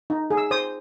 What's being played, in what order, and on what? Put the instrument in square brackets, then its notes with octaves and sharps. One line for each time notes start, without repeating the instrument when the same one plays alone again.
[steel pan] D#4
G#4
E6
C5 D#6